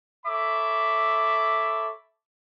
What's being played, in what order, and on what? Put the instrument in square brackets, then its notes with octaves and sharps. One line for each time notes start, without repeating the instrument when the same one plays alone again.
[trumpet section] A4 C#5 E5 B5 D6